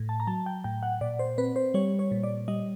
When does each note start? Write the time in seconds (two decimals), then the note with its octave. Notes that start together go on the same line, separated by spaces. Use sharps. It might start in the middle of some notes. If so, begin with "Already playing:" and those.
Already playing: A2
0.09 A5
0.20 A#5
0.27 F#3 A5
0.46 G5
0.64 A2 G5
0.83 F#5
1.01 A#2 D5
1.19 C5
1.38 C4 B4
1.56 C5
1.74 G3 C#5
1.99 C#5
2.12 A#2
2.23 D5
2.48 G3 D#5